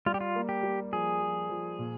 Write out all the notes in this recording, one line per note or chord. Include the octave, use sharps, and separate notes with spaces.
G3 F4
G4
F4
A#3
G4
G3
F3 G#4
F3
F3
A#2